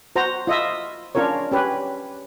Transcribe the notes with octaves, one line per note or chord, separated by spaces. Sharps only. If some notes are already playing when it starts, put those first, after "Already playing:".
F#4 C5 A#5
F4 D#5 E5
C#4 D4 F4 A#4 C#5
C#4 G4 B4